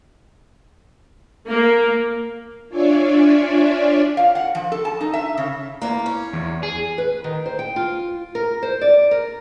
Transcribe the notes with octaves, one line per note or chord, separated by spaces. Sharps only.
A#3
D4 F4 C#5 D5 E5 G#5
F5
F#5
F3
A4
A5
D#4
E5
C#3
E2 A#3
C#4
E2
G#4
B4
D#3
C5
G5
F4
A#4
C5
D5
A#4